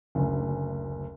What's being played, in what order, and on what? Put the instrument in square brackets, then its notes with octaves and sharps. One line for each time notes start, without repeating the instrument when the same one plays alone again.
[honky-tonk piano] F#1 D2